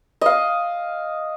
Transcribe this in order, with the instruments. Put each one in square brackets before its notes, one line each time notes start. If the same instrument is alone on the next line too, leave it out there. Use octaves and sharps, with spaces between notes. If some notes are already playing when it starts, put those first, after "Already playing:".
[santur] D#5 F5